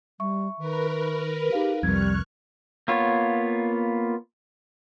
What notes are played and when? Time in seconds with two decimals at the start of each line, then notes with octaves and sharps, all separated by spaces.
0.20 G3 E5 C#6
0.59 D#3 A#4 B4
1.52 D#4 G4 G#4 F5
1.83 C2 F2 G3 C#6 F6 F#6 G#6
2.88 A#3 B3 F4 C#5